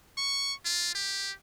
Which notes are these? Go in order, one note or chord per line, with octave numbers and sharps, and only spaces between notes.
C#6
F4
G4